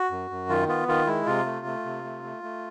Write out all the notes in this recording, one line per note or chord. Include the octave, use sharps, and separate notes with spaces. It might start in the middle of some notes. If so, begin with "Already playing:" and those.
Already playing: F#4
F#2
F#2
D#3 F4
B3 F4
D#3 F4
G#3 E4
C3 F4
A3
A3
C3
A3
A3
A3